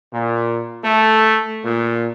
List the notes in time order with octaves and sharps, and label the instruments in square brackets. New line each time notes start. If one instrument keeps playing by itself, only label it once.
[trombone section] A#2
A3
A#2